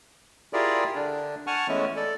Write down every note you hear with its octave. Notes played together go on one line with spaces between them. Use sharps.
E4 F4 G4 G#4 A#4 D5
D3 D4
F#5 G#5 A5 C#6 F6
E3 G#3 A3 B3 C#4 E4
A4 D5